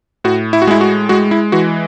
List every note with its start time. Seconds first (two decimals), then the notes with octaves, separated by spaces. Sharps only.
0.24 A2 F#4
0.53 E4
0.62 F#4
0.67 G#3 E4
0.81 F#4
1.09 G#3 F#4
1.31 E4
1.52 E3 F#4